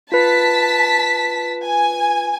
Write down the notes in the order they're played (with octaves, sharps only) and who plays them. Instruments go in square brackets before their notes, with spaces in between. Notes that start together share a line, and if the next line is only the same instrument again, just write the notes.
[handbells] F4 B4 [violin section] A5 B6
[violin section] G#5